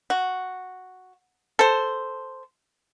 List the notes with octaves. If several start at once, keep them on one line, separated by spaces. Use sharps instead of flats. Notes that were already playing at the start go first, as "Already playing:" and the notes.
F#4
A4 C5